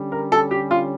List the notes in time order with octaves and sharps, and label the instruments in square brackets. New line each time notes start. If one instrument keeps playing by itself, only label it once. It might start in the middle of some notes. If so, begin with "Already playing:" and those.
Already playing: [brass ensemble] D3 G3 C#4
[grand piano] A#4
A4
G4
F4